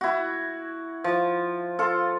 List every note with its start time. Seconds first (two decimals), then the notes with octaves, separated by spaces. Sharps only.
0.01 E4 F#4
1.04 F3
1.79 F4 A4